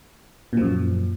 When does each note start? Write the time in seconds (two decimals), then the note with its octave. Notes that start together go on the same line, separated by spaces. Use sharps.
0.53 A#2
0.57 F3
0.62 F#2